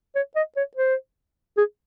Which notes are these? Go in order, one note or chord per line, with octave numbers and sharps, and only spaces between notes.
C#5
D#5
C#5
C5
G#4